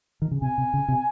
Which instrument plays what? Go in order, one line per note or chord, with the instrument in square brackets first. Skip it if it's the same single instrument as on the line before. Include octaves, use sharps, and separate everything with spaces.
[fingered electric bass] D#3
C#3
[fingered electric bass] C3 [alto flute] G#5
[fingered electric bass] C3
C#3
C3